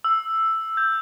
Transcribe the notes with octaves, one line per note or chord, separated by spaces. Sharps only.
E6
G6